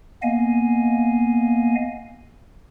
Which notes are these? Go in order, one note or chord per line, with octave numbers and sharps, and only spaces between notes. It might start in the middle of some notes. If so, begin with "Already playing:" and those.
A#3 B3 D#5 F5 G#5